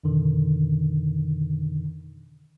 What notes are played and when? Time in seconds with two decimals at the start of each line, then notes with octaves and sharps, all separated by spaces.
0.04 F2 B2 D3 D#3